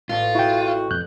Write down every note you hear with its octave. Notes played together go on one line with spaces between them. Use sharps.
A1 F4 A4
E4 F#4 G5
F2 F#6 G6